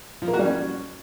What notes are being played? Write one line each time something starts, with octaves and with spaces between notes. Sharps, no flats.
F3
A#3
F#4
G3
C#4